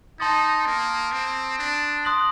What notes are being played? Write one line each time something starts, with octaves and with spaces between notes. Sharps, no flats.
D#4 A5 C6 D#6 A6
A#3
C4
D4
C6 D#6 F#6 A#6 F#7